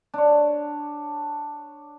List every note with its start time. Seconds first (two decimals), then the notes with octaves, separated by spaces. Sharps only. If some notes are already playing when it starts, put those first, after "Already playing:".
0.14 D4 C#5